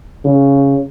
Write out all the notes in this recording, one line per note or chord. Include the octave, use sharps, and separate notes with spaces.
C#3